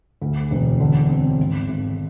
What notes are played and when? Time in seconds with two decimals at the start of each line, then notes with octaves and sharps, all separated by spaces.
0.22 D2
0.51 E1
0.80 D3
1.09 C4
1.39 G#1
1.68 G#1